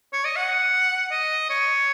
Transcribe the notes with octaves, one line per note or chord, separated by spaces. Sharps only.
C#5
D#5
F#5
D#5
C#5